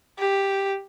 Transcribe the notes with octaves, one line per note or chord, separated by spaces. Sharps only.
G4